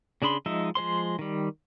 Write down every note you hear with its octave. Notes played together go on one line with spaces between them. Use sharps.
C#3 D4 G#4 B5 C6
F3 G#3 D#4 D#5 E5
F3 G#3 C5 C6
D#3 G3